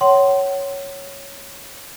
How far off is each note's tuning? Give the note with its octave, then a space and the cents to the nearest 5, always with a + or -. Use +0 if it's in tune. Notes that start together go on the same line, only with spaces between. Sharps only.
C#5 +0 F#5 +40 C6 +0